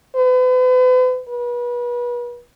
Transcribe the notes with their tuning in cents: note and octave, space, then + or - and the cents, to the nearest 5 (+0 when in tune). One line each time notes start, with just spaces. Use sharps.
B4 +40
B4 -35